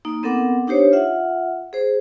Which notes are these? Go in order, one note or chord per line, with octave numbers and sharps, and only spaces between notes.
A#3 D#4
B3 C4 A4 A#4 F#5 D6
D4 D#4 G4 C5 C#5
F4 E5 F#5
G#4 C5